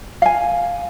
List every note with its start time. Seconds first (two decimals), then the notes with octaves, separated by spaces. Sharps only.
0.22 F5 G#5